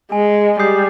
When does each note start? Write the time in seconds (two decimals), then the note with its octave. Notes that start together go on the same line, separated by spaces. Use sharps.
0.12 G#3 G#5
0.59 G3 D#6 G6 C7